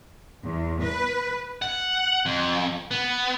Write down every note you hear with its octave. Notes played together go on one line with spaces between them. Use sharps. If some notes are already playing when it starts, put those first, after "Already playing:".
E2
B4
F#5
F2
B3